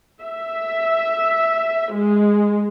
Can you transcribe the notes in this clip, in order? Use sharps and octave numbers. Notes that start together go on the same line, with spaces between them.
E5
G#3